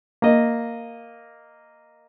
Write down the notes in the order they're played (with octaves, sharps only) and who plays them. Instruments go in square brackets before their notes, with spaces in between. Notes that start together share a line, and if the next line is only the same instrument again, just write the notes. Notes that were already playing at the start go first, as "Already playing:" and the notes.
[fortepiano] A#3 D#5